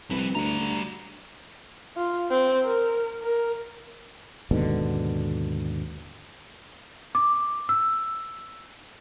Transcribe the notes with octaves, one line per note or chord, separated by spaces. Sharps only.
C2 F3 B4
D2 G3 A#5
D2
F4
C4
A#4
A#4
D#2 G#2 B2 D3
D6
E6